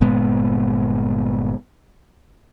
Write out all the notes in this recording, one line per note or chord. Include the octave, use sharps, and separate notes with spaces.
G1 A#2 G#3 B3